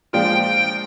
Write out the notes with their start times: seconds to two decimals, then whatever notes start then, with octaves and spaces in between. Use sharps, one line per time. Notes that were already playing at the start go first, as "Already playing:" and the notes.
0.13 A#2 F3 G#3 D4 F4 G5
0.43 G5